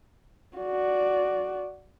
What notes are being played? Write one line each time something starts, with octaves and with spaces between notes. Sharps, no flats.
F#4 D5